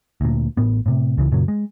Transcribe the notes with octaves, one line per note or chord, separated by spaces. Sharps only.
D2 A#2
A1 A2 B3
A2 C3
C#2 C#3 E3
F#2 A#2 C#3 F#3
G#3